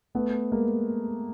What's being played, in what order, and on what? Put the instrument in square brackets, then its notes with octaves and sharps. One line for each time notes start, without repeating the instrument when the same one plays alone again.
[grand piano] A3 B3
G#3 A#3